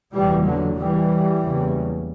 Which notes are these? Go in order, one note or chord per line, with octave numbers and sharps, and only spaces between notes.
F#1 E2 B2 E3 G3
D3 F#3
E3 G3
F#1 E2 C#3